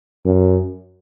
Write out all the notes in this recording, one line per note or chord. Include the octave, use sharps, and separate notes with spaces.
F#2